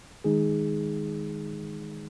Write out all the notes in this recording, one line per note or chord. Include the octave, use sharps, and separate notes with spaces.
D#3 G#3 D#4 G#4